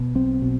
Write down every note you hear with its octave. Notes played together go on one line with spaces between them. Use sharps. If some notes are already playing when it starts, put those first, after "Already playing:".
Already playing: B2
B1 C4
B2